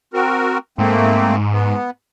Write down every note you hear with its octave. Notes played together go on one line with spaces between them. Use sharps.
C4 F#4 A#4
G#2 A3 A#3 C4
B3